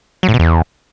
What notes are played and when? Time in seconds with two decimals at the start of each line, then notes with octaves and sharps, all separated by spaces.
0.23 F#3
0.29 A2
0.34 B2
0.39 E2